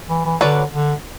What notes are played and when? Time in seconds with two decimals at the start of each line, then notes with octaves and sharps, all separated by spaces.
0.10 E3
0.25 E3
0.41 D3 F#3 C#4 F#4 B4 D5
0.72 D3